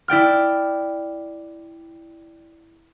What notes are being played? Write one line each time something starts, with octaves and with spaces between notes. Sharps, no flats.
E4 D5 G5 F6